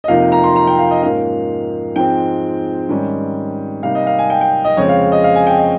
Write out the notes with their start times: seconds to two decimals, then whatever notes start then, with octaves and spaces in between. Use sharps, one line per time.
0.04 D#5
0.08 F2 C3 F3 A#3 D#4 F5
0.32 A#5
0.44 C6
0.56 A#5
0.67 G5
0.79 F5
0.91 D#5
1.02 G#2 F3 A#3 C#4 F5
1.96 G#2 F3 G#3 C4 G5
2.89 G#2 D#3 G3 C#4
3.83 C3 G3 A#3 D#4 F5
3.95 D#5
4.07 F5
4.19 G#5
4.30 G5
4.41 G5
4.64 D#5
4.77 F2 C#3 G#3 C4 C#5
4.89 F5
5.12 D#5
5.24 F5
5.35 G#5
5.47 G5
5.58 D#5